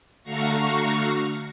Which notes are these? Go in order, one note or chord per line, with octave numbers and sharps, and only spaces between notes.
D3 A3 F#4 F5 A#5 C#6